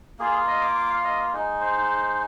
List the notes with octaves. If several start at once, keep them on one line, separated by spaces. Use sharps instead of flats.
A#3 F4 G#4
D#5
D6
D6
F5
D#5
G#3 D#4
C5